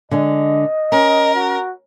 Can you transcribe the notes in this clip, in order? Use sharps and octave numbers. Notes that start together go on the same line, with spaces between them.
D3 G#3 D4 D#5
C#4 A#4
F#4